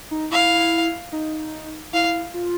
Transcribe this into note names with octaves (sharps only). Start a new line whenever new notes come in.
D#4
E4 F5
D#4
E4 F5
F4